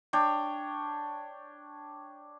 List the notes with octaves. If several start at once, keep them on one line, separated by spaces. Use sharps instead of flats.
D4 C#5 G5